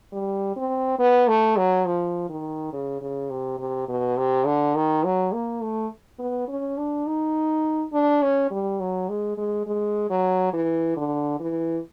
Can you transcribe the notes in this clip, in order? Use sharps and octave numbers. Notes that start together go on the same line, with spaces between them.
G3
C4
B3
A3
F#3
F3
D#3
C#3
C#3
C3
C3
B2
C3
D3
D#3
F#3
A#3
A3
B3
C#4
D4
D#4
D4
C#4
G3
F#3
G#3
G#3
G#3
F#3
E3
D3
E3